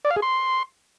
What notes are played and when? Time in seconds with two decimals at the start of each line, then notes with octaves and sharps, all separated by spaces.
0.05 D5
0.11 F5
0.16 G#4
0.22 C6